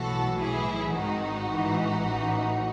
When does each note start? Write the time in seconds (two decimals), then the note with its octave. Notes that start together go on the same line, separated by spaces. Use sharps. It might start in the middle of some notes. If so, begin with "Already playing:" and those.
Already playing: B1 A2 E3 F#4 A4
0.38 B1 A2 E3 E4 G#4
0.93 G#1 G#2 D#3 D#4 F#4
1.49 A1 G#2 E3
2.03 A1 A2 E3